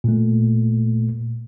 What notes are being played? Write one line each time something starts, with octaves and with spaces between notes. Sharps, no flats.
A#2 A3